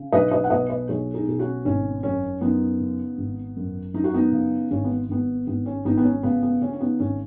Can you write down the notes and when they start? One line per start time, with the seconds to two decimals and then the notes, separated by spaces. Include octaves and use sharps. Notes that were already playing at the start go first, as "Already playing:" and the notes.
Already playing: C#3
0.12 B1 B4 D#5
0.31 B4 D#5
0.44 F#5
0.50 B2 B4 D#5
0.69 B4 D#5
0.89 B1 G#4 C#5
1.14 D#4 G#4
1.27 B2 G#4
1.39 C#4 F#4
1.65 G#1 C#4
2.03 F#2 C#4
2.41 F#2 B3 D#4
2.80 C#3
3.18 G#1
3.57 F#2
3.94 F#2 D#4
4.04 F#4
4.14 B3 D#4
4.32 C#3
4.71 G#1 C#4
4.84 B3
5.09 G#1 B3
5.47 G#1 B3
5.66 C#4
5.85 G#1 B3 D#4
5.97 B3
6.04 C#4
6.23 C#3 B3
6.43 B3
6.62 C#3 C#4
6.73 C#4
6.80 B3 D#4
7.00 G#1 C#4